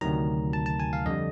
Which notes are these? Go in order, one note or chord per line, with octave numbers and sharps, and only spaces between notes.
D2 C3 D#3 F#3 A#5
A5
A5
G#5
F5
F2 D3 G3 D#5